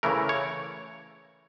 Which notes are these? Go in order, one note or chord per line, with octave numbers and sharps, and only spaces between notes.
C#3 E3 A3 A#4
C#5